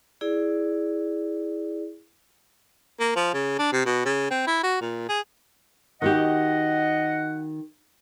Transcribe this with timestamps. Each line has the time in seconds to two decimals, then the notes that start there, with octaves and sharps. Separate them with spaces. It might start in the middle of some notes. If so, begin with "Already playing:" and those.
0.21 E4 G#4 D5
3.00 A#3
3.16 F3
3.34 C#3
3.59 D4
3.73 C3
3.85 B2
4.05 C#3
4.30 C4
4.47 E4
4.63 F#4
4.81 A#2
5.08 G#4
6.02 D#3 F#4 G4 D#5 F#5